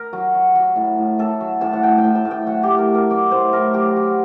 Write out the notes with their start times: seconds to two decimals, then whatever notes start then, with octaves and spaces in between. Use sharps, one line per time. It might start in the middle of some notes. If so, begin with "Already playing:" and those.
Already playing: A#4
0.13 F#3
0.34 F#3
0.55 F#3
0.76 A2
0.98 A2
1.18 A2 A4
1.41 F#3
1.61 A2 A5
1.73 F#5
1.83 A2 G5
1.98 G5
2.04 A2
2.15 A5
2.25 A2
2.31 G5
2.46 F#3 F#5
2.63 A2 G4
2.78 A#4
2.89 F#3
2.95 A#4
3.10 F#3 D5
3.31 A2 C5
3.53 A2 A#4
3.74 F#3 G4
3.96 F#3